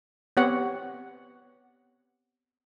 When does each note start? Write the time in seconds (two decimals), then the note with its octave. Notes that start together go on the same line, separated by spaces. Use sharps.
0.37 B3 C4 G4 C#5 F#5